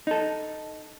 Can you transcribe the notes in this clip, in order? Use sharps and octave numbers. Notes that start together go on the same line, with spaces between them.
D#4 A4